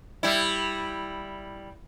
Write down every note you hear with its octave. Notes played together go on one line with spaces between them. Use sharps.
G3 E4